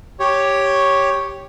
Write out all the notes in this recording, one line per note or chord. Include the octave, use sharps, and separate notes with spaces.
G4 C#5